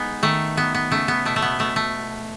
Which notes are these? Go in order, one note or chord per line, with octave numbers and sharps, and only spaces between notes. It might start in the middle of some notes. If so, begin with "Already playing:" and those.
Already playing: G#3 B3 D#4
D#3 A3
F#3 B3
B3
C#3 A3
B3
B2 A3
A3
B3
B2 A3
A3